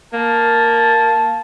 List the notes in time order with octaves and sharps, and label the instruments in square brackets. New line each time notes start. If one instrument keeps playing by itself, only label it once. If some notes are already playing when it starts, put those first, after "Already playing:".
[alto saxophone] A#3 [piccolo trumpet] A5